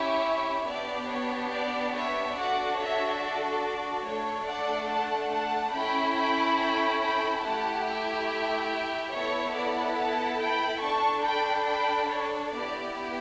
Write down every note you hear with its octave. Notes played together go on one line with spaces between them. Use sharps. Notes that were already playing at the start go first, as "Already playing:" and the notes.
Already playing: C#4 E4 G4 C#5 E5
B3 D4 G4 D5
C#5
D5
C#5 E5
D4 F#4 A4 D5 F#5
C#5 E5
D5
A3 D4 A4 C#5
D5 F#5
F#5 A5
F#5 A5
C#4 E4 A4 G5 B5
G5 B5
G5 B5
G5 B5
A3 E4 G4 F#5 A5
E5 G5
E5 G5
B3 E4 A4 C#5 E5
D5 F#5
F#5 A5
G5 B5
D4 A4 A5 C#6
G5 B5
G5 B5
C#5
B3 E4 G4 D5